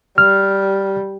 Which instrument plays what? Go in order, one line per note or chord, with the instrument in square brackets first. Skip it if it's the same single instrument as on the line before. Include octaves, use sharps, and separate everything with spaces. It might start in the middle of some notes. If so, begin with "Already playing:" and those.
[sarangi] G3 [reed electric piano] F6